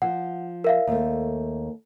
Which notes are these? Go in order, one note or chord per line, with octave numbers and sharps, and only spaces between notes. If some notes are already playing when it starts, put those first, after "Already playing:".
F3 F#5
A#4 E5 F5
D#2 A3